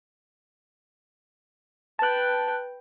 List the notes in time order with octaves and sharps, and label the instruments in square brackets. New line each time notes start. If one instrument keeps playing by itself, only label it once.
[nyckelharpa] B4 G5 [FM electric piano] A5 F#6